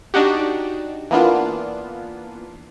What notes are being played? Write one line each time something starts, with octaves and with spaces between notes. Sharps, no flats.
D4 D#4 F#4 G4
E3 A#3 B3 D4 F4